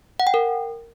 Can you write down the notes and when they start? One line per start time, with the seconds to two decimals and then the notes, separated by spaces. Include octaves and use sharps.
0.20 F#5
0.27 G5
0.34 A#4